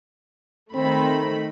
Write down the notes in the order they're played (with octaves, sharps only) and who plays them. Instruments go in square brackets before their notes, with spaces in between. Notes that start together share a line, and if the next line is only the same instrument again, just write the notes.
[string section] D#3 A3 B5 [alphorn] C4